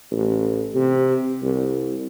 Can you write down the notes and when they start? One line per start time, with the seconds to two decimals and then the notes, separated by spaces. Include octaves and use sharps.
0.12 A1
0.75 C3
1.43 C2